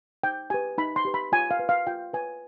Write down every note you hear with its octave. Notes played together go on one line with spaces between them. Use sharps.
D#4 G5
G4 B4 G#5
D#4 B5
C6
G4 B4
B5
F4 G#5
F5
B4
F5
F4 G5
B4 G#5